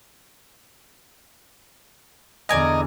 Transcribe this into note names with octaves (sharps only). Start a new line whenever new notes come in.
E2 D3 D5 D#5 G#5 A#5